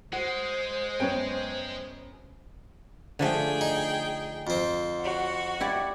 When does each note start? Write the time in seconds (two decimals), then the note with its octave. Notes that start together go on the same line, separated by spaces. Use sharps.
0.13 G#3 F#4 C5
1.00 F#2 B3 C#5 G5
3.19 D3 F3 A3 G#4 G5
3.61 D#4
4.47 F2 C4
5.01 F#4 F#5
5.60 E4 G4 D5